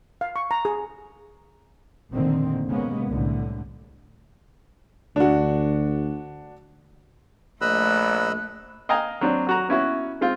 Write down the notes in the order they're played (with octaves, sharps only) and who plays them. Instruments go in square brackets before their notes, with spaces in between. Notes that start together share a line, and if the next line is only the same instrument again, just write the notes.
[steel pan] F5
C#6
A#5
G#4
[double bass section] F1 A#2 D3 D#3 A#3 C4
C3 G#3 A#3 B3 C#4
C2 A2 D3 A3
[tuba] D2 [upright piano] D4 F#4
[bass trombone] A#1 [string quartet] A3 [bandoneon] D#5 B5 E6 [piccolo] F#6
[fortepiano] D#5 F5 G5 G#5 A#5
F#3 C4 D4
F#3 F#4 A#5
B3 C#4 E4 F#4
G#3 C4 F4